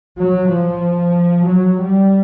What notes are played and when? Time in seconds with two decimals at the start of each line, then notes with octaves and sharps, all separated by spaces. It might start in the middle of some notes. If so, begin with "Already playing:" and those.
0.19 F#3
0.51 F3
1.48 F#3
1.80 G3